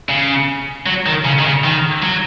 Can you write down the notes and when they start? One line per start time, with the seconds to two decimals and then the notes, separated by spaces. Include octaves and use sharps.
0.09 C#3
0.87 F#3
1.06 D#3
1.25 C#3
1.39 D#3
1.45 C#3
1.64 D#3
2.02 F#3